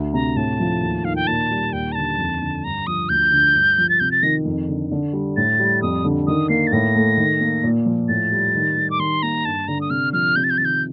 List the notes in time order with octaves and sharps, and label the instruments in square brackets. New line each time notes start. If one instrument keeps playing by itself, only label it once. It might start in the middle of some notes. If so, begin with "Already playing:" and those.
Already playing: [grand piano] D2
[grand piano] C3 [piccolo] A#5
[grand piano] A2 [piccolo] A5
[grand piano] F3
D#2
[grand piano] D#3 [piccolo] F5
[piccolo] G5
[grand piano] A#2 [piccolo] A5
[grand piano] G3
[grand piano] D#2 [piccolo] G5
[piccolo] A#5
[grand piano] D3 [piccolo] A5
[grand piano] F2
D3
[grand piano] G2 [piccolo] A#5
[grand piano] F3 [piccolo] D#6
[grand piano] D2 [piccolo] G6
[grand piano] D3
G2
F3
[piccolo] A6
[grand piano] C3 [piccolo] G6
[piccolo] A6
[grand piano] D#3 [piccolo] A#6
[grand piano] F2
D3
D3
G3
[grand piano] A2 [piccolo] A6
[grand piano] G3
[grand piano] F2 [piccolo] D#6
[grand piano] D3
[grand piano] D#3 [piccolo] D#6
[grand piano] A#3 [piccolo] C7
[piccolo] A6
[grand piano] A2 [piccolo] A#6
[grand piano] A3
D#3
A#3
A#2
F3
[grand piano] A2 [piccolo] A6
[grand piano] G3
D#3
G3
[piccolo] D6
[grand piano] D#3 [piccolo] C6
[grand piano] A#3 [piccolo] A#5
[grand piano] G2 [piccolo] A5
[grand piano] D3 [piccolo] A#5
[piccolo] D#6
[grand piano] C3 [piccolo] F6
[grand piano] F3 [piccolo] F6
[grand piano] C3 [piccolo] G6
[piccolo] A6
G6
[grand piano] D#3 [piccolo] A6
[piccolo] G6